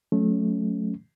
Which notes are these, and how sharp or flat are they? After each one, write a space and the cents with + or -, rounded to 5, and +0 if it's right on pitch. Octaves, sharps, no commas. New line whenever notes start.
F#3 -30 A3 -20 C#4 +0